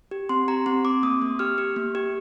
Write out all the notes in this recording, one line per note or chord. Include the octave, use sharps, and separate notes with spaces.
G4
C4 C6
G4 A#5
C4 C6
C4 D6
A#3 D#6
A#3
G4 F6
G4
A#3
G4